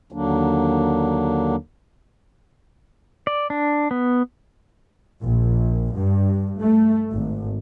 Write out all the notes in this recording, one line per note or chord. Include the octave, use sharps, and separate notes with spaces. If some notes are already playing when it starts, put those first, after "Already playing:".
D#2 D3 F#3 A#3 D4
D5
D4
B3
A#1
G2
A3
G#1